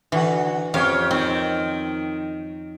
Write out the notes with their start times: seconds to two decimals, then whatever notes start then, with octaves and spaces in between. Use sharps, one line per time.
0.12 D3 E3 F#4
0.74 F2 C#4 G4 C#5 F5
1.11 D#3 C4